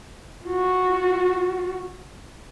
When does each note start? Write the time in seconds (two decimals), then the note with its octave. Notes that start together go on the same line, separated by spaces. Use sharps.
0.44 F4 F#4